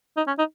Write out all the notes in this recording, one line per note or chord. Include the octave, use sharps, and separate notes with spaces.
D#4
C#4
D#4